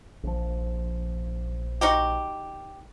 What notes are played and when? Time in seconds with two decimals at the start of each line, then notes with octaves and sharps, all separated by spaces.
0.23 A#1 F3
1.81 D#4 F#4 G4